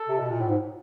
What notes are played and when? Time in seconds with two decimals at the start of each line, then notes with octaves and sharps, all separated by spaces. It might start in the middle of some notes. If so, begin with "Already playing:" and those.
Already playing: A4
0.08 C3
0.19 B2
0.30 A#2
0.41 A2
0.48 G#2